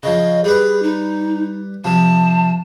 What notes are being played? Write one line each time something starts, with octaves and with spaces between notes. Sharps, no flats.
C#3 F3 D#5
G3 G#4 B4
D#4
C3 F3 A5